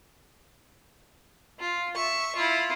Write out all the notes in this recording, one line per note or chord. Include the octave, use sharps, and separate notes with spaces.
F4
E5 C#6
E4 F4